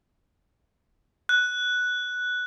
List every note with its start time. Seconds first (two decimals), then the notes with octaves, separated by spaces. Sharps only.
1.29 F#6